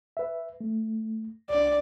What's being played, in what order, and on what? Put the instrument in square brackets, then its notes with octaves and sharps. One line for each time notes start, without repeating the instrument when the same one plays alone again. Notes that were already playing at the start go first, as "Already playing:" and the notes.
[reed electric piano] B4 E5
A3
[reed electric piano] C2 D4 [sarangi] D5